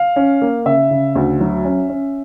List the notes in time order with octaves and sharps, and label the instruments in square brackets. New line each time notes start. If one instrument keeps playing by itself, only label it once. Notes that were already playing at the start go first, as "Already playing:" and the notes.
Already playing: [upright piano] F5
C#4
A#3
C#3 E5
C#3
D2
F#3
C#4
C#4